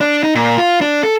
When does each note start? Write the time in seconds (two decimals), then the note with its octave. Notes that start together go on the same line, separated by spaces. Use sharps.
0.01 D4
0.23 D#4
0.35 A#2
0.58 F4
0.81 D4
1.03 A4